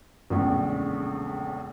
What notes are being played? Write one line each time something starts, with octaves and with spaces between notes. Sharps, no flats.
A#1 E2 A2 C#3 G#3